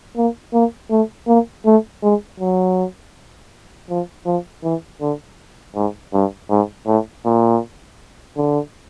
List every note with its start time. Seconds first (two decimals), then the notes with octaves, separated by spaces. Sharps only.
0.17 A#3
0.53 A#3
0.90 A3
1.28 A#3
1.66 A3
2.03 G#3
2.40 F#3
3.90 F3
4.26 F3
4.64 E3
5.01 D3
5.75 G#2
6.13 G2
6.50 G#2
6.87 A2
7.25 A#2
8.37 D3